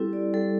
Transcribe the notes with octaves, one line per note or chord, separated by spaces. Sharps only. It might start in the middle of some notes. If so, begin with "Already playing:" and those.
Already playing: G3 C4 E4 G4 A4
D5
G3 A4